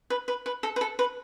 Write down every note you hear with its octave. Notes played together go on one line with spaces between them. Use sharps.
B4
B4
B4
A4
B4
A4
B4